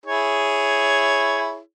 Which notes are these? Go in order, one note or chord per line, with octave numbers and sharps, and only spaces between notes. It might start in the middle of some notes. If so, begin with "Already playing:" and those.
E4 G#4 C#5